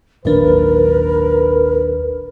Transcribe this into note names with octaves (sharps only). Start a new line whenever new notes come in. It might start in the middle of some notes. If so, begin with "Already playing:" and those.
G#1 D#2 A#2 F#3 D4 A#4 B4